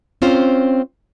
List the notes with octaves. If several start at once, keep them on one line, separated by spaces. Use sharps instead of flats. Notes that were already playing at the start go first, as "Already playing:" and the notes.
C4 C#4 F4 C5